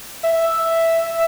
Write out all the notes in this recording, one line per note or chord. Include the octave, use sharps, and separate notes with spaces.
E5